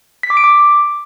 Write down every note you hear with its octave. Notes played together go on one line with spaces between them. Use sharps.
B6
D6
D7
D6